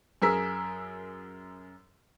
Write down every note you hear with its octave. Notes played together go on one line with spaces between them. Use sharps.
F#2 G#4 A#4 E6 B6